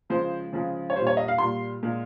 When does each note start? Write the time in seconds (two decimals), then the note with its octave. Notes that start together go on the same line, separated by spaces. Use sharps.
0.09 C#3 F3 G#3 C5
0.53 C#3 F3 G#3
0.90 C#5
0.95 G3 C5
1.00 A#2
1.07 C#5
1.17 D#5
1.28 F5
1.38 A#2 G3 C6
1.83 A#2 G#3